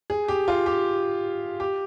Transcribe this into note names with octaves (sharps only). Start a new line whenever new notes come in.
G#4
G4
F4
G4
G4